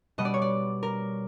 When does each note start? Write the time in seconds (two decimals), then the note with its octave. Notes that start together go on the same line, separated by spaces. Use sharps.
0.18 B2 G3 B3 D#5
0.25 D5
0.34 C#5
0.42 D5
0.83 A#4